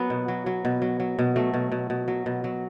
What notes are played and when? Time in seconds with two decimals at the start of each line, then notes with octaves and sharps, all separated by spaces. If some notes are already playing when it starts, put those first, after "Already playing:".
Already playing: F#3 B3
0.10 B2
0.28 F#3
0.46 F#3
0.65 B2
0.82 F#3
1.00 F#3
1.19 B2
1.36 F#3 A3
1.54 B2
1.72 B2
1.90 B2
2.08 F#3
2.26 B2
2.44 F#3